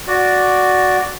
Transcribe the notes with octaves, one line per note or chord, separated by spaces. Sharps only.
F#4 D5